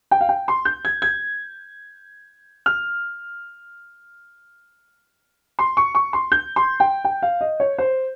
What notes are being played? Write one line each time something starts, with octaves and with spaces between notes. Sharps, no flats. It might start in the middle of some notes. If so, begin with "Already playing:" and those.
G5
F5
G5
C6
G6
G#6
G#6
F6
C6
C#6
C#6
C6
G6
C6
G5
G5
F5
D#5
C#5
C5